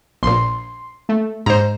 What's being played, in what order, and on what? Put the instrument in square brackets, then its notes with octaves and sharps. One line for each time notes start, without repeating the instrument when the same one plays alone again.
[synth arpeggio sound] A#1 A#2 [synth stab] C6
[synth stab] A3
[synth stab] G#2 [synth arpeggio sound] C5 A#5